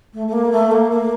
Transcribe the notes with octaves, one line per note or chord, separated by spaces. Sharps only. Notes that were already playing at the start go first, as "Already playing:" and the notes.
A3
A3
A#3
A3
A#3
A#3